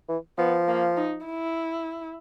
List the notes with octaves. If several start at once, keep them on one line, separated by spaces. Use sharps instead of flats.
E3
F3 B3
A#3
D#4
E4